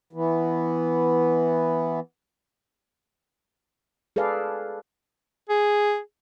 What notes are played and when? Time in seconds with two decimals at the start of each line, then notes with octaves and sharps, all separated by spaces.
0.13 E3 B3
4.16 G#4 A4 B4 D5 F5
5.49 G#4